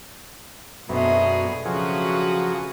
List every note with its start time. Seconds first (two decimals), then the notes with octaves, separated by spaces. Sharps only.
0.89 F#2 B2 A3 B3 C4 D4 G#4
1.66 C#3 F3 F#3 F#4 G#4 B4